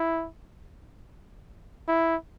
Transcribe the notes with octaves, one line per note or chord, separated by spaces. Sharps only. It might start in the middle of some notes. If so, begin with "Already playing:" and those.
Already playing: E4
E4